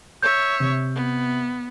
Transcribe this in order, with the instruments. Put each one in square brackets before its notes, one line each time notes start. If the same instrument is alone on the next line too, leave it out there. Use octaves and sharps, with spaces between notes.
[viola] C#5 E5 [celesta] G6
[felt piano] C3
[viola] B3